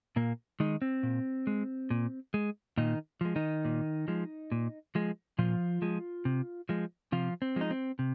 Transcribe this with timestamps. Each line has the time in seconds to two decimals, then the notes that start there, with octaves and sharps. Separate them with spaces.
0.16 A#2 A#3
0.60 D#3 G#3 D#4
0.82 C4
1.03 A#2
1.47 G#3
1.90 A#2
2.34 G#3
2.77 A#2 D#3 D#4
3.21 F3 G#3
3.36 D#3 D#4
3.65 A#2
4.08 F3 G#3
4.52 A#2
4.95 F3 G#3
5.39 A#2 F3 F4
5.82 F3 G#3
6.25 C3
6.69 F3 G#3
7.12 C3 F3 F4
7.42 C4
7.56 F3 G#3 D#4
7.71 C4
7.99 C3